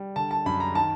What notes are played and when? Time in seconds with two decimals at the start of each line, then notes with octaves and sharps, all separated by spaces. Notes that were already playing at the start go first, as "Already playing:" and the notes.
Already playing: G3
0.16 D3 A5
0.31 A5
0.46 F#2 B5
0.60 A#5
0.75 D#3 A5